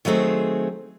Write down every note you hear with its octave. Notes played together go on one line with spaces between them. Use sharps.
D#3 F#3 A3 C4 G#4